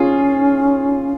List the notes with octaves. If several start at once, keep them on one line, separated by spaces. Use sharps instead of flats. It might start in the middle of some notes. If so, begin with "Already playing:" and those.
Already playing: C#4 F4 G#4